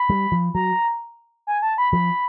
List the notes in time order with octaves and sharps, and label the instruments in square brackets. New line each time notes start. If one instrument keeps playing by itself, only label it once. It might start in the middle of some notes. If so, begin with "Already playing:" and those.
Already playing: [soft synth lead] B5
[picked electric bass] G3
F3
[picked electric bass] F#3 [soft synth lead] A#5
[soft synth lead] G#5
A5
B5
[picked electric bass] F3 [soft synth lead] B5